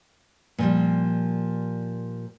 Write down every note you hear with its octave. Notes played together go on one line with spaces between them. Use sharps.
A#2 F3 G3